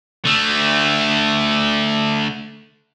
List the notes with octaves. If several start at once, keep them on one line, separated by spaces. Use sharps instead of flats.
D3 A3